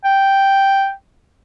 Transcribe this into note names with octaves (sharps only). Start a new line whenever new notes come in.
G5